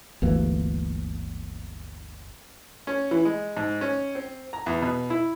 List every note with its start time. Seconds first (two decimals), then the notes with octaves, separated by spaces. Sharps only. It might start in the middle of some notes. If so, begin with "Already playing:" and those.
0.22 G1 D2 E3 A#3
2.87 C#4
3.11 E3
3.25 G#3
3.57 G#2
3.81 C#4
4.15 C4
4.53 A#5
4.66 E2
4.82 B2
5.10 E4